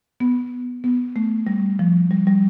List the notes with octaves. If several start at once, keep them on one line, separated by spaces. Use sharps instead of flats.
B3
B3
A3
G3
F3
G3
G3